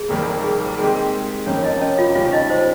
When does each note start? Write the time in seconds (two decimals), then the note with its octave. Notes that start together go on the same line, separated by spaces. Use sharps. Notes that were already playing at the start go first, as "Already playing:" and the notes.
Already playing: G#4
0.08 F1 D#2 D#3 G3 A#3
0.43 G#4
0.67 A#4
0.78 D#3 G#3 C4 G4 G#4
0.95 A#4
1.46 F1 F2 D#3 A#3 C#4 C#5
1.64 D#4 D#5
1.81 C#4 C#5
1.98 F4 F5
2.15 D#2 C#3 G3 C#4 F4 G4 F5
2.32 D#4 D#5
2.50 C5